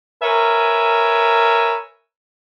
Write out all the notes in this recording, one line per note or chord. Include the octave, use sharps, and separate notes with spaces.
A#4 B4 C#5 E5 G#5